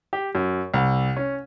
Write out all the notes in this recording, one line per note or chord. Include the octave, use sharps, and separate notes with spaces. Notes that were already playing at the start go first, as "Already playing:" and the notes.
G4
F#2
C2
C#4